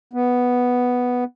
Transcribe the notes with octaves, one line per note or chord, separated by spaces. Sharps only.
B3